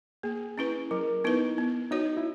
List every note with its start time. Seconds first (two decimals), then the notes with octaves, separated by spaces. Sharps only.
0.23 A#3 G#4
0.58 C#4 E4 B4
0.91 F#3 A#4
1.24 B3 D#4 E4 B4
1.58 B3
1.91 D#4 F#4 C#5
2.17 E4